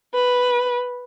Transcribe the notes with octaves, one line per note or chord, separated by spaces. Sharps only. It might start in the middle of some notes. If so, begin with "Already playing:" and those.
B4